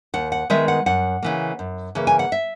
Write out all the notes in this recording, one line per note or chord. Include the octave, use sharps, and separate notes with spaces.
D#2 F#5
F#5
D#3 G#3 B3 E5
F#5
F#2 F#5
C#3 E3 A#3
F#2
C#3 E3 A#3
G#5
F#5
E5